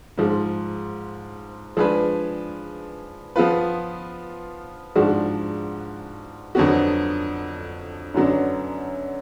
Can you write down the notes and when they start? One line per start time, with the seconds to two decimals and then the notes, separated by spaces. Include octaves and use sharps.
0.18 G#2 F3 G#3
1.77 F3 G#3 D4 G#4 B4
3.36 F3 B3 F4 B4
4.96 G#2 F3 G#3 D4 F#4
6.55 F2 D3 F#3 B3 F#4
8.14 F#2 D3 F#3 B3 D4